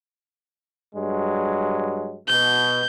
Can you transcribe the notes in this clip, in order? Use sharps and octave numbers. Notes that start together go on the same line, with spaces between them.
G2 F#3 G#3
B2 G6